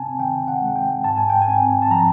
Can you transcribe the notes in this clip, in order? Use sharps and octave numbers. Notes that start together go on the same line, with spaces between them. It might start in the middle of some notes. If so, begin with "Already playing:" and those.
Already playing: C3 C4 G#5 A5
D#3 G5
F#5
G#3
G5
G#2 A5
G#5
G5
G#5
C4
A5
F3 A#5